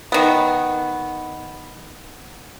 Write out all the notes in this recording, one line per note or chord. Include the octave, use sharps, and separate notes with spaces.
D#3 B3